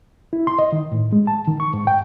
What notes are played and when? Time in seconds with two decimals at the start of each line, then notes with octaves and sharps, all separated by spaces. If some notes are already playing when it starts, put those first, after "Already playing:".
0.33 E4
0.47 C6
0.59 D#5
0.72 D#3
0.92 A2
1.13 G#3
1.27 A5
1.48 D#3
1.60 C#6
1.73 G#2
1.87 G5